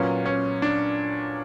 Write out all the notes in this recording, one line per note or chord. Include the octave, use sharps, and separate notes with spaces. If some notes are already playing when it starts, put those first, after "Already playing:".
Already playing: A#2 F#3 B3 C#4
C#4
D4